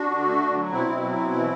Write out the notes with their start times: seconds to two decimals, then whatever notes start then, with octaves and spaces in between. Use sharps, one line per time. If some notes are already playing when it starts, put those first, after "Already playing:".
Already playing: D4 F#4
0.10 D3
0.25 A3
0.41 D3
0.56 F#3
0.71 B2 C4 E4
0.87 B2
1.02 F#3
1.18 B2
1.33 E3